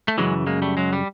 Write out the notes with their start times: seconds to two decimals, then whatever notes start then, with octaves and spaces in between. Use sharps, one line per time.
0.08 A3
0.18 F#2 C#3 E3 F#3 G#3
0.47 G#3 A#3
0.62 G3 A3
0.77 F#3 G#3
0.93 G3